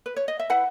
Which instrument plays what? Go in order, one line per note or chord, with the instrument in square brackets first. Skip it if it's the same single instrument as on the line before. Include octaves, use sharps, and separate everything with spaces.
[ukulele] B4
C#5
D#5
E5
E4 B4 F#5